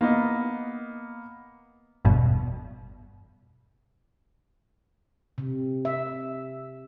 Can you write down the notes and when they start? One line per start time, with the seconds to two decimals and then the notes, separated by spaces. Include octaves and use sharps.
0.01 A#3 B3 D#5
2.05 G1 E2 G2 B2
5.38 C3
5.85 E5